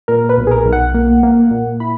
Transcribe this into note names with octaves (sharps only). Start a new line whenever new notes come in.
A#2 A#4
B4
B1
G#4
A#4
B1
F#5
A#3
A#3
A#2
E4 B5